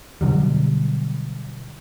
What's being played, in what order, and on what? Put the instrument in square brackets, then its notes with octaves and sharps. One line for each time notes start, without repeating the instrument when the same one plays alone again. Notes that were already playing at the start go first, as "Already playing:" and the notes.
[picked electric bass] B2 D3 F#3 G3